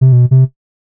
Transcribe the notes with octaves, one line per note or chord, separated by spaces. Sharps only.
C3
B2
C3